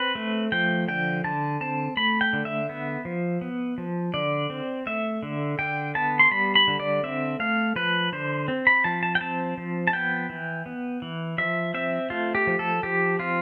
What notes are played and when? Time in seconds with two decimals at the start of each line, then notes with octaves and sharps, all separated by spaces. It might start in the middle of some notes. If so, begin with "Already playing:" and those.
Already playing: C4 B4
0.15 A3
0.52 F3 G5
0.88 D3 G5
1.24 D3 A5
1.61 C4 A5
1.97 A3 B5
2.21 G5
2.33 D3
2.45 E5
2.69 B3
3.05 F3
3.41 B3
3.78 F3
4.14 D3 D5
4.50 C4
4.86 A3 E5
5.23 D3
5.59 D3 G5
5.95 B3 A5
6.19 C6
6.31 G3 B5
6.55 B5
6.67 D3
6.80 D5
7.03 C4 E5
7.40 A3 F5
7.76 F3 B4
8.12 D3 C5
8.48 C4
8.67 B5
8.84 F3 A5
9.03 A5
9.15 G5
9.21 C4 A5
9.58 F3
9.87 A5
9.93 B3 G5
10.29 E3
10.66 B3
11.02 E3
11.38 F3 E5
11.74 C4 E5
12.10 A3 F4
12.35 G4
12.47 F3
12.59 A4
12.83 F3 G4
13.19 C4 F4